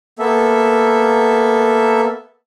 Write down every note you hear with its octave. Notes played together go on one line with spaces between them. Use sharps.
A#3 B3 A4 E5